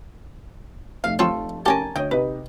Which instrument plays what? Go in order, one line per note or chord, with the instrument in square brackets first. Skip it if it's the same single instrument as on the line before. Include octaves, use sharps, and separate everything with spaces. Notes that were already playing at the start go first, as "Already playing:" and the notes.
[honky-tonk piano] F1 A3 D#4 [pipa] F5
[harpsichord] F3 C4 C#5 [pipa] F4 A4
[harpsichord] C#4 G4 [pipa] A#4 G#5 A5
[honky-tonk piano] D2 C#5 [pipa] D#5 G5
[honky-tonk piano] C3 D#4 [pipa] B4